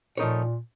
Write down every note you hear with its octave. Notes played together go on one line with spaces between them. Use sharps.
A#2 F3 A3 D#4 A#4 C#5